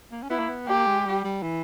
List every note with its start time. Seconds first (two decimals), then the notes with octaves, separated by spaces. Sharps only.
0.11 A#3
0.23 C#4
0.30 B3 E4
0.39 A#3
0.49 B3
0.68 A#3 G4
0.87 G#3
1.06 G3
1.24 G3
1.42 E3